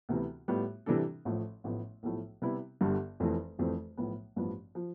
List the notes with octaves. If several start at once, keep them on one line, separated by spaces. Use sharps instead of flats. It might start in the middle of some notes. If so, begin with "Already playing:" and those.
D2 C3 E3 B3
A2 G3 B3 F4
C3 E3 G3 D4 A4
A1 A2 F3 A3
A1 A2 F3 B3
B1 A2 F3 A3 E4
C3 G3 B3 E4
G1 G2 D3 G3
F1 F2 E3 A3
F1 F2 E3 A3 C4
B1 A2 F3 B3
A1 G2 F3 B3
F3